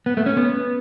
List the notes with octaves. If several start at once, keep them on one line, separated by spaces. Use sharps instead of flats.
B3
A3
C#4
B3